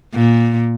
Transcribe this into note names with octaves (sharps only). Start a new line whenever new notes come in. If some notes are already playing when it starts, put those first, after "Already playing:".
A#2